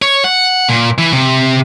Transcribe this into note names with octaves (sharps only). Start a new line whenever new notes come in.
C#5
F#5
A#2
E3
C3